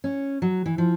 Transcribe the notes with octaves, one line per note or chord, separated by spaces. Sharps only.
C#4
F#3
E3
F3